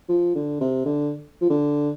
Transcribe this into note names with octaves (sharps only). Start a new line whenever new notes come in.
F3
D3
C3
D3
F3
D3